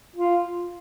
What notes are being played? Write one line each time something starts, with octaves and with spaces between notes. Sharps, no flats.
F4